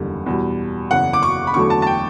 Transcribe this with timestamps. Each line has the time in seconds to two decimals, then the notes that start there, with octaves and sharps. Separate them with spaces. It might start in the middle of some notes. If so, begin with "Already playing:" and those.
Already playing: F#1 E2 D3 G3
0.26 E2 B2 G3
0.91 F#1 E2 C#3 F#5
1.13 D6
1.23 C#6
1.47 B5
1.54 E2 D3 F#3 A3 C#6
1.70 A5
1.82 A5
1.87 G5